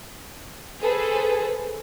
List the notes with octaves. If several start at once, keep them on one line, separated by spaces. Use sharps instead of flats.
G#4 A4 B4 C5